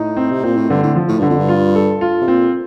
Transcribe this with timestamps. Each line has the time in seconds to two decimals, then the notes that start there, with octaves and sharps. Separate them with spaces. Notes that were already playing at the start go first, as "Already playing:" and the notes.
Already playing: A2 D#4
0.17 C4
0.31 C3
0.43 A#2 C4
0.57 A2
0.70 G2 D3
0.83 A2
0.96 F3
1.09 A2
1.19 G2 D3
1.30 F2
1.39 G2
1.49 F4
1.75 A4
2.01 F4
2.22 C3
2.28 A#2 C4